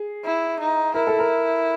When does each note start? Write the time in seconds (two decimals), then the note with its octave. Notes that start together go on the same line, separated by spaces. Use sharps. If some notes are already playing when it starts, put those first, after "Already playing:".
Already playing: G#4
0.24 E4
0.59 D#4
0.94 E4 A#4
1.07 A4
1.19 A#4